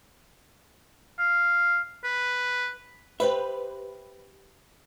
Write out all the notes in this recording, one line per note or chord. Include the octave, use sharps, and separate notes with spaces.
F5
B4
G4 B4 C5 E5